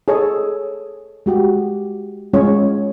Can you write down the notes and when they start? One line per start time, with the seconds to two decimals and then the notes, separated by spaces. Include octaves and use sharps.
0.08 G#4 A4 C#5 D#5
1.26 G#3 F#4 G4
2.33 G#3 C#4 F4 C#5